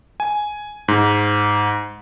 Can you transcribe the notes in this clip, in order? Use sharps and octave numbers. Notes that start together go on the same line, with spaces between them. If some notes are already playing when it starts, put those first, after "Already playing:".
G#5
G#2